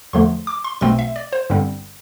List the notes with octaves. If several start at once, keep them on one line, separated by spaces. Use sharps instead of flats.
E2 D3 F3 A3 C6
D6
C6
B1 B2 A3 C4 C6
E5
D5
C5
G1 G2 D3 G3 C4